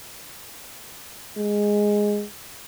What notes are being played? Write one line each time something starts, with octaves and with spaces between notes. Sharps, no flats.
G#3